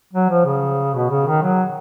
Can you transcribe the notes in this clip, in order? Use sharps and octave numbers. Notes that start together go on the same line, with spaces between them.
F#3
F3
C#3
B2
C#3
D#3
F#3